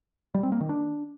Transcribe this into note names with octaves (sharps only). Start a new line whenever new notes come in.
G3
C4
A#3
D#3
D4